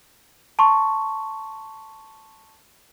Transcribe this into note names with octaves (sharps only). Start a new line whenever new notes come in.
A5 C6 C#6